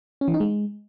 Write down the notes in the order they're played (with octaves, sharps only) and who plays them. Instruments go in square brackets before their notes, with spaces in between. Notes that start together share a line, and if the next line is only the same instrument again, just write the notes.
[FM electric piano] C#4
E3
D#4
G#3